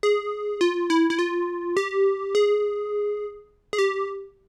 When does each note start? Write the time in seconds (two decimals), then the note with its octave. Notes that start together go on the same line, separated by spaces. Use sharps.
0.03 G#4
0.61 F4
0.90 E4
1.10 E4
1.19 F4
1.77 G4
2.35 G#4
3.73 G#4
3.78 G4